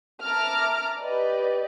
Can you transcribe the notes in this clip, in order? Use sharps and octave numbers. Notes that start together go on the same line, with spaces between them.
E5 A5 A#5 D6 F6
G4 B4 D5 D#5